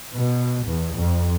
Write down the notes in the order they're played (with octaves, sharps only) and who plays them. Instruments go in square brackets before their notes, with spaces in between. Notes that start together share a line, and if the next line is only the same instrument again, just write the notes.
[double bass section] B2
E2
F2